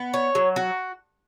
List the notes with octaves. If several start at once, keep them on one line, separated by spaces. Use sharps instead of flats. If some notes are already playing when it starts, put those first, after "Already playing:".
Already playing: B3
C#5
F#3
F#4